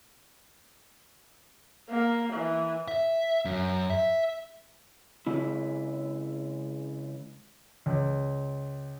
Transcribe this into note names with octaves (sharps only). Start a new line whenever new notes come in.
A#3
E3
E5
F#2
E5
C#3 G#3 E4
C#2